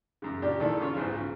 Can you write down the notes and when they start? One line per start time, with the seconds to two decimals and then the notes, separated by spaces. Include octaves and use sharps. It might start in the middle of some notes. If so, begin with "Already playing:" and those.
0.22 F#2 C#3
0.42 A#2 C#3 D4 G4
0.60 A#2 D#3 G#3 D4 E4 A4
0.80 C#3 C#4 F4 C#5
0.94 B1 G#2 E3 F3
1.17 C#3